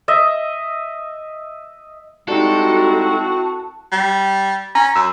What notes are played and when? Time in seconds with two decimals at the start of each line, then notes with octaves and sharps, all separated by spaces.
0.08 D#5 E5
2.29 G3 G#3 C4 D#4 E4 F#4 A4
3.92 G3
4.75 C#4 A#5
4.96 F#2 E6